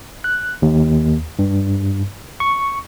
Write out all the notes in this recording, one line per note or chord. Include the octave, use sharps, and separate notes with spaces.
F#6
D#2
G2
C#6